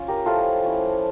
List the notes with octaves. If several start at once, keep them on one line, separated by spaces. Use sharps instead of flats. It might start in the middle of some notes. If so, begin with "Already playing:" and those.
Already playing: C#4 F4
G4 A#4
F3 C#4 E4 F4 A4
F3 C#4 E4